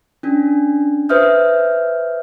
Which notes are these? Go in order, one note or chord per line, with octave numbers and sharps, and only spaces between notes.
C#4 D4
B4 C5 E5 D#6 F6 G6